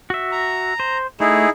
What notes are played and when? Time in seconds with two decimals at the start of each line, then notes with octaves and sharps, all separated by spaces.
0.10 F#4 E5
0.32 A#5
0.80 C5
1.20 A3 D#4 E4 G#4